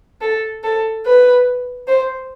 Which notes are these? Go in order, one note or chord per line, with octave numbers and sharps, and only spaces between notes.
A4
A4
B4
C5